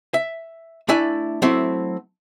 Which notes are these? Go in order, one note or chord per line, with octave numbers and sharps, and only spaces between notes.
E5
A3 D4 E4 D5 E5 G#5
F#3 A3 C4 E4